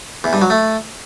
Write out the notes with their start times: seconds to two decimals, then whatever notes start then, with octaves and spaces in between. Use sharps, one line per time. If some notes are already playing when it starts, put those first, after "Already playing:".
0.24 E2
0.33 G2
0.42 F#3
0.50 A3